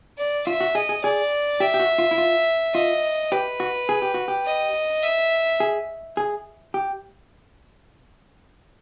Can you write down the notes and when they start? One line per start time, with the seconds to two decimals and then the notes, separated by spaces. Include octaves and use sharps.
0.18 D5
0.47 F4 E5
0.61 F#4
0.75 G#4 D#5
0.89 G#4
1.04 G#4 D5
1.60 G4 E5
1.74 G4
1.80 F#4
1.98 F4
2.11 E4
2.18 F4
2.74 F4 D#5
3.32 G4 B4
3.60 F#4
3.89 G#4
4.02 G4
4.14 F#4
4.28 G4
4.46 D#5
5.03 E5
5.60 G#4
6.17 G#4
6.74 G4